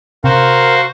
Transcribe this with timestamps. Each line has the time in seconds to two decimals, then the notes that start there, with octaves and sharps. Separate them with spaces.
0.24 C3 F#4 A#4 C5 F5